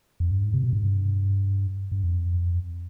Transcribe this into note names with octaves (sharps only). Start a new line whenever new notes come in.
F2
G2
G#2
C3
B2
G#2
G2
G2
F2